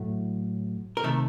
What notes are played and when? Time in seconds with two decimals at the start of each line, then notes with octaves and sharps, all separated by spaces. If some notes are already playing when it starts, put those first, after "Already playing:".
Already playing: A2 F#3 A3
0.97 A#4
1.04 C3 D#3 A3 A4